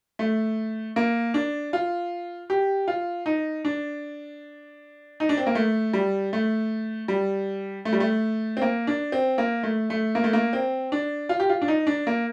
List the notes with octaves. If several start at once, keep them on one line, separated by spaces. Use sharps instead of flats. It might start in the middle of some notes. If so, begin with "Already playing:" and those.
A3
A#3
D4
F4
G4
F4
D#4
D4
D#4
D4
C4
A#3
A3
G3
A3
G3
A3
G3
A3
C4
A#3
D4
C4
A#3
A3
A3
A#3
A3
A#3
C4
D4
F4
G4
F4
D4
D#4
D4
A#3